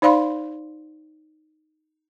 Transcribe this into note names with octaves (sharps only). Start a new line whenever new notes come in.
D#4 C5 D5 F5 B5 C6